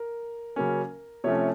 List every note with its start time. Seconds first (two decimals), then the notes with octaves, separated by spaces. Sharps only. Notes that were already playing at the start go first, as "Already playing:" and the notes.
Already playing: A#4
0.56 C#3 F#3 A#3 C#4
1.24 C3 F3 A3 C#4 C#5